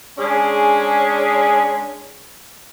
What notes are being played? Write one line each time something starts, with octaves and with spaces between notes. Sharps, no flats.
G#3 C#4 D4 G#4